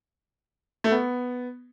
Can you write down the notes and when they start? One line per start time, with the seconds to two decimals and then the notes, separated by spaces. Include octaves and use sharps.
0.84 A3
0.92 B3